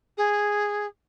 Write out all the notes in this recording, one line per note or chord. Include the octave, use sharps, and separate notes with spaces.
G#4